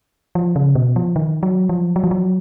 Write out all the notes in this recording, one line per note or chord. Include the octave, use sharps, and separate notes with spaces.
F3
C#3
B2
F3
D#3
F#3
F3
F#3
F3
F#3